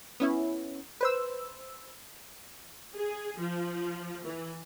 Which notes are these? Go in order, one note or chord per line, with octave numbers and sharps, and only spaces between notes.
B3 C#4 E4
B4 C5 E6
G#4
F3
E3